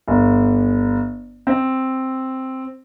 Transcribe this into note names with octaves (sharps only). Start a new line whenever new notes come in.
G1
C4